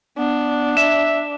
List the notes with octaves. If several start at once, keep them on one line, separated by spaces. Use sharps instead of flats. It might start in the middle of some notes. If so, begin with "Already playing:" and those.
B3 D4
E5 E7